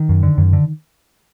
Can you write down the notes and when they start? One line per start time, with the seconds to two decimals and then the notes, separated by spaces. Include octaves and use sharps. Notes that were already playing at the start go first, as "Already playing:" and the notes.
Already playing: D#3
0.09 F#2
0.23 D3
0.38 F#2
0.53 D3